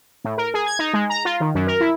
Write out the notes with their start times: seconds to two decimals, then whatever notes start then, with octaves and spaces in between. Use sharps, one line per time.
0.24 A2
0.38 A#4
0.54 G#4
0.66 G#6
0.79 D#4
0.93 G#3
1.10 A#5
1.25 F4
1.40 D#3
1.55 F#2
1.67 A#4
1.80 E4